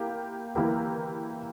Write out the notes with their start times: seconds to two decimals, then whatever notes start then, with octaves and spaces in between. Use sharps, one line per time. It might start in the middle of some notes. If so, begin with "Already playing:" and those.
Already playing: A#3 E4 G4 A#4
0.55 E3 A#3 E4 G4 A#4